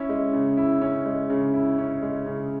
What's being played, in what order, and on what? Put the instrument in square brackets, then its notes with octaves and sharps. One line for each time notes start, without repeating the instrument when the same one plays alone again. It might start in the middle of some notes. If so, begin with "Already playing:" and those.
Already playing: [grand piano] C#4 E4
G#3
C#3
E4
C#4
G#3
C#3
E4
C#4
G#3
C#3